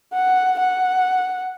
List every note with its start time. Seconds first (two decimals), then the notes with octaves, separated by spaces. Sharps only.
0.13 F#5
0.59 F#5